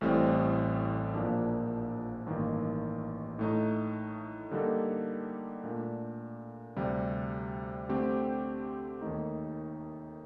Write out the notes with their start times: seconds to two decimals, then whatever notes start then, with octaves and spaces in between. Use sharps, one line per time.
0.01 A1 A2 G3 C4
1.14 A#1 A#2 F3 A#3 D4
2.26 A1 G2 D#3 A#3
3.39 A2 A3 D#4
4.51 D3 G3 A#3 D#4 A4
5.64 A#2 A3 D4
6.76 D2 C3 G3
7.89 D3 A3 C4 G4
9.02 D#2 D#3 A3 D#4